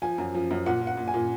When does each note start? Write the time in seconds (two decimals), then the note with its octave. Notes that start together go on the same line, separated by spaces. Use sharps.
0.02 F3 G#5
0.18 F#2
0.34 F3
0.50 F#2
0.66 A#2 F#5
0.81 A#2
0.87 F#5
0.97 A#2
1.08 G#5
1.14 A#2